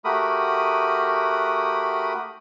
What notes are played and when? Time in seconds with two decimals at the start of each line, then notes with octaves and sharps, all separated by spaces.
0.05 A3 F#4 G4 A#4 B5 D#6